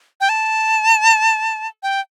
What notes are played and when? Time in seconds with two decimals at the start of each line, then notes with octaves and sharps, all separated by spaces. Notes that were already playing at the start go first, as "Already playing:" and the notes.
0.21 G5
0.29 A5
1.83 G5